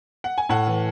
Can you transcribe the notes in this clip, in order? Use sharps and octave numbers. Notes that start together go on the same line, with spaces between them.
F#5
G#5
A2 F#5 A5
E3